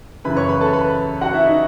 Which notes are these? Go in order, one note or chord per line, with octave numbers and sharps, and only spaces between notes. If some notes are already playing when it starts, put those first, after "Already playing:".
F#2 C#3 E3 B4 B5
C#5 C#6
B4 B5
A4 A5
B4 B5
F#4 F#5
E4 E5
D#4 D#5